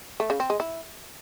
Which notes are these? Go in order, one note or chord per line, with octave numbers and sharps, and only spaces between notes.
A3
C#3
C4
G#3
E4